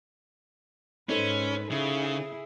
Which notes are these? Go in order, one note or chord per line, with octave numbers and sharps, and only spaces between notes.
G#2 C#4 D#4 A4 B4 C5
C#3 E4 G#4